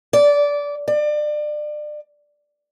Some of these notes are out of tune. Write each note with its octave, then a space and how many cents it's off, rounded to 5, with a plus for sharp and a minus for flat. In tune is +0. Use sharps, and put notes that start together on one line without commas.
D5 -20
D5 +30